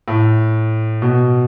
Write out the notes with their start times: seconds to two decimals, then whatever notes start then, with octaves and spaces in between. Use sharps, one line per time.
0.08 A2
1.02 B2